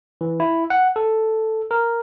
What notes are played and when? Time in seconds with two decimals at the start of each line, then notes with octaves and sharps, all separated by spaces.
0.21 E3
0.40 E4
0.70 F#5
0.96 A4
1.71 A#4